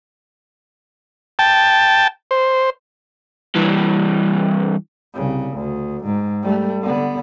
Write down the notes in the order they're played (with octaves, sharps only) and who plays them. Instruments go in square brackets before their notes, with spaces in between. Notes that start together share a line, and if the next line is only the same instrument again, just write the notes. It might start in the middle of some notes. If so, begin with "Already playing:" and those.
[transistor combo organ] G5 A5
C5
[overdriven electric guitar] G2 E3
[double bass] C2 C#3
D2
G#2
G3 A3
D3 B3